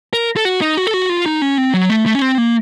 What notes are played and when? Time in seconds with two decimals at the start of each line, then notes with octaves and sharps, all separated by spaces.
0.13 A#4
0.36 A4
0.45 F#4
0.61 D#4
0.77 F#4
0.87 A4
0.94 F#4
1.09 F4
1.26 D#4
1.42 C#4
1.58 C4
1.74 F#3
1.90 A3
2.06 A3
2.15 C#4
2.22 C4
2.38 A#3